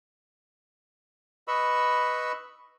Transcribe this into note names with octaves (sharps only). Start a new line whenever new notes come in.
B4 D#5 B5 C#6 E6